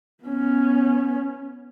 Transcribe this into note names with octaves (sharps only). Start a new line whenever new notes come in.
B3 C#4